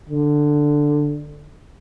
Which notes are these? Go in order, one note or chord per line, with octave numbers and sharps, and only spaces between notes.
D3